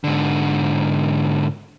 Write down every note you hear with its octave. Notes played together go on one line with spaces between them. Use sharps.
G#2 D3